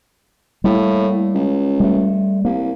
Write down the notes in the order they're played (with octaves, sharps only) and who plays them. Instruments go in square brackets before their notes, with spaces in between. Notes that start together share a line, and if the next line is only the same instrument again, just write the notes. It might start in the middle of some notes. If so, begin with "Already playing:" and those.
[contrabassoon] A2 [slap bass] G3 A3 A#3
[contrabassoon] C#2
[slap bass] G3 A3
[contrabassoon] C2 [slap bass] A#3